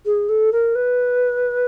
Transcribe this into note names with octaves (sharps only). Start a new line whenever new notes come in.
G#4
A4
A#4
B4